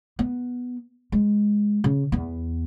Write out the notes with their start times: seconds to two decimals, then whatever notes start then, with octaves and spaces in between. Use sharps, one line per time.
0.19 B3
1.12 G#3
1.84 C#3
2.12 E2 B3